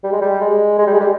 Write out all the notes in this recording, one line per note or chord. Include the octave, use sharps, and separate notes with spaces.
G3
G#3
G3
G#3
G#3
G3
G#3
G3